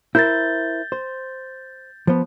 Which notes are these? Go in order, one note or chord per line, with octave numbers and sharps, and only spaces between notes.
E4 A#4 C5 G6 A6
C5
F3 B3